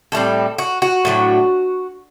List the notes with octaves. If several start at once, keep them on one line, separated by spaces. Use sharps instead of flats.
A2 G3 C4 A4
F#4
F#4
A2 F#3 B3 D4